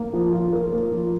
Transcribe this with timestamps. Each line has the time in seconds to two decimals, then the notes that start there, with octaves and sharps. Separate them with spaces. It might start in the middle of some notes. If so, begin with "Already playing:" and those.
Already playing: A#3
0.13 F3
0.33 F4
0.53 A#4
0.72 A#3
0.92 F3